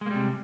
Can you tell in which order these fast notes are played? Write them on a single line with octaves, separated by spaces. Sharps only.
G#3 A#3 G3 C3